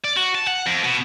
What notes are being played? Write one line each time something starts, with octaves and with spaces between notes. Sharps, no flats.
D5
F#4
A5
F#5
F2
B2